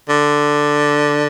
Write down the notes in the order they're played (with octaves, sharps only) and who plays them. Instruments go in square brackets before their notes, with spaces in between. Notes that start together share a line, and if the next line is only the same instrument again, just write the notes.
[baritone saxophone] D3